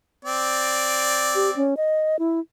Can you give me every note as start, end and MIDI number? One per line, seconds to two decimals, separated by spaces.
0.25 1.69 60
0.25 1.69 74
1.35 1.50 67
1.56 1.74 61
1.77 2.17 75
2.19 2.40 64